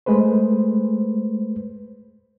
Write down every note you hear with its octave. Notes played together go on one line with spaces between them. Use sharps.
G#3 A3 B4 C5